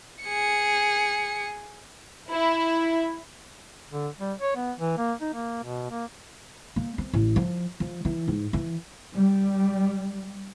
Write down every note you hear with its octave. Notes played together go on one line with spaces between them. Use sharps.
G#4 C#7
E4
D3
G3
C#5
B3
E3
A#3
D#4
A#3
B2
A#3
A#3
C4
A1
F3
F3
E3
G#2
E3
G3